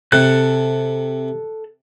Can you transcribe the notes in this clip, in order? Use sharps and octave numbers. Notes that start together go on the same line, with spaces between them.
C3 A4 F#6